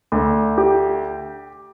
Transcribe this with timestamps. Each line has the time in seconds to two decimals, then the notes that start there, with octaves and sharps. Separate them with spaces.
0.12 D2
0.58 G4